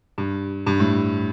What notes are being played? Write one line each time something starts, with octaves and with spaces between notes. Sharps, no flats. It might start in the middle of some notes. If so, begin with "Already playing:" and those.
G2
G2
A2